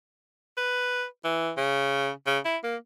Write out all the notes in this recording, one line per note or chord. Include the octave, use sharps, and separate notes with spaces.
B4
E3
C#3
C#3
E4
A#3